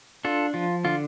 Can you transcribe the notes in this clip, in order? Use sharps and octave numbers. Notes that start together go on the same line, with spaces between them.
D4 F4 A4
F3 F4
D3 F4